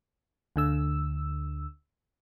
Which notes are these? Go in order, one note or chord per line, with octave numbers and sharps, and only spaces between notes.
D2 D3 E6